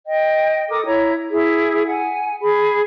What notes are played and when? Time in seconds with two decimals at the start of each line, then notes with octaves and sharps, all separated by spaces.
0.06 D#5 G5
0.70 A4 A#4 D6 D#6
0.86 E4 C#5 A#5
1.31 E4 G#4
1.87 F#5 G#5
2.41 G#4 B5